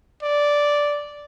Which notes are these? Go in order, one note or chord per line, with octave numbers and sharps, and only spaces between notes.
D5